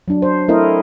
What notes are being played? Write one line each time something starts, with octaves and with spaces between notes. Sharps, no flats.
F#3 D4
C5
A3 C4 E4 A#4 D#5